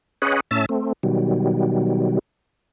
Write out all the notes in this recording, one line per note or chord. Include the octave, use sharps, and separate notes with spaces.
C#4 G#4 B4 C#5 D#5 F#5
A2 C#4 E5 A5
A3 C4
B2 D#3 F#3 G3